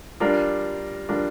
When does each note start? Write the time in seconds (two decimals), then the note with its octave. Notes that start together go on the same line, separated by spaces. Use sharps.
0.20 G3 D4 F4 A#4
1.09 G3 D4 F4 A#4